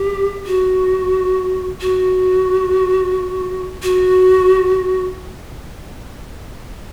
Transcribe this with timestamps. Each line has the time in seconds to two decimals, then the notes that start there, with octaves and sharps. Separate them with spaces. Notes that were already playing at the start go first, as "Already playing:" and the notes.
Already playing: G4
0.46 F#4
1.81 F#4
3.83 F#4